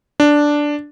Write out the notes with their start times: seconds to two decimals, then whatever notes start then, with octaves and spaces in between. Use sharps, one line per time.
0.20 D4